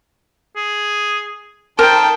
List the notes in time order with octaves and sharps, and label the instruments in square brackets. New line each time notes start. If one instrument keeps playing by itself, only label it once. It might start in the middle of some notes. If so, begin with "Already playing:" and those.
[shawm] G#4
[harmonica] D#3 A4 [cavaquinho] A#4 [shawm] C5 [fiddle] G5